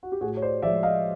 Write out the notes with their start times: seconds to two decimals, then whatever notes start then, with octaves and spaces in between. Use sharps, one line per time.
0.03 F#4
0.12 G4
0.21 A2 F#4 G#4
0.37 C#5
0.42 C5 D5
0.62 F3 G#3 D5 E5
0.83 D#5 F5